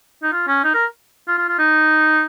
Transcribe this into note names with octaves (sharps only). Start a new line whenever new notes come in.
D#4
F4
C#4
D#4
A#4
F4
F4
F4
D#4